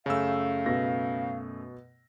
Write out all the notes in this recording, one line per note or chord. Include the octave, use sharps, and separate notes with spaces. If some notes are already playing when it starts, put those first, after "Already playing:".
F#2 C#3 A3 F5 E6
B2 A#6